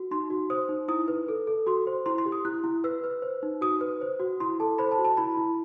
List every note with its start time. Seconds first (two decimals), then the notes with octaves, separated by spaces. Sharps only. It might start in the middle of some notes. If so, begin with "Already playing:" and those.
Already playing: F#4
0.11 D#4 C6
0.30 F#4
0.50 C5 D#6
0.69 D#4
0.88 E4 D#6
1.08 B4
1.28 A4
1.47 A4
1.67 F#4 C6
1.87 C5
2.06 E4 C6
2.18 C6
2.26 G4
2.32 D#6
2.45 E4 F#6
2.64 E4
2.84 B4 E6
3.04 B4
3.22 C5
3.43 D#4
3.61 F#4 D#6
3.81 B4
4.01 C5
4.20 F#4
4.40 E4 C6
4.60 A4 A5
4.78 C5 B5
4.92 A5
4.98 F#4
5.05 A5
5.17 E4 B5
5.37 E4